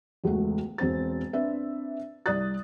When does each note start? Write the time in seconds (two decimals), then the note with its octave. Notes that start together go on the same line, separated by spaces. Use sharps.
0.24 E1 C#2 A3 F#4
0.78 E1 C4 C5 A6
1.33 C4 D4 B4 E5
2.26 C2 D5 D#6 F#6 A6